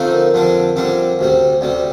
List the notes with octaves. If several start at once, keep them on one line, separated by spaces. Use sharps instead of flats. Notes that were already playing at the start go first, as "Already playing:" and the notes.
Already playing: D3 F3 A3 C4 D#4
A#4
F2 D3 G3 D4
F2 D3 G3 D4
D2 C3 G3 C5
D2 C3 G3 D5